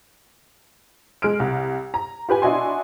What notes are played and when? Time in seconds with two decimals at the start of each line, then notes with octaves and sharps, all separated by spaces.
1.22 G#3 F6 D7
1.40 C2
1.94 A#5
2.29 F4 G4 B4 G#5
2.42 D4 E4 F#4 D#5 G#5 C6